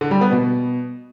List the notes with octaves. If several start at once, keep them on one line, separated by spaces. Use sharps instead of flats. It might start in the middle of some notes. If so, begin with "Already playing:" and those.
D3
G3
B3
B2